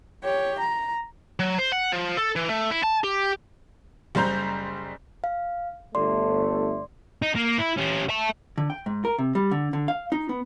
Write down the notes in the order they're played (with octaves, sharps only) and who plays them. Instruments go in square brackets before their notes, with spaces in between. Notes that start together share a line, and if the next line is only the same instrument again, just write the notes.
[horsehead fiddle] G4 C#5
A#5
[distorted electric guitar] F#3
C5
F#5
F3
A4
E3
A3
E4
A5
G4
[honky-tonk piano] F#1 G3 C5 A#5 G6
[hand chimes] F5
[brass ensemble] G1 A3 [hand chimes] D5 C6
[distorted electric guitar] D#4
A#3
E4
C#4 G4
E5 A5
[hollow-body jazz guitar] D3
G5
G#2
A#4
C3
G3
D3
D3
F5
D#4
B3